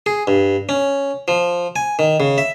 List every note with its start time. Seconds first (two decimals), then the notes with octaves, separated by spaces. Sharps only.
0.06 G#4
0.27 G2
0.69 C#4
1.28 F3
1.76 G#5
1.99 D#3
2.20 C#3
2.38 E5